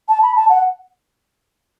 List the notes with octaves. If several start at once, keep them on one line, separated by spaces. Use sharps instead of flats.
A5
B5
A5
F#5